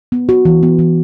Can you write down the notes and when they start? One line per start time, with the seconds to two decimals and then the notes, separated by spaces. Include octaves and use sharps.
0.12 B3
0.29 F#4
0.45 E3
0.63 B3
0.79 E3